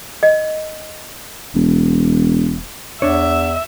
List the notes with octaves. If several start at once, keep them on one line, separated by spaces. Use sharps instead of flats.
D#5
E1
E2 D4 C#5 E5